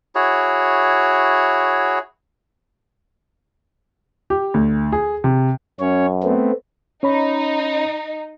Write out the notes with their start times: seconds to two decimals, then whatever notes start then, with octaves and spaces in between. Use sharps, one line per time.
0.15 E4 F#4 G#4 C#5
4.30 G4
4.54 D2
4.92 G#4
5.24 C3
5.80 F#2 C#4 C#5
6.24 A3 B3 C4
7.03 C#4 D#4 C#5 B5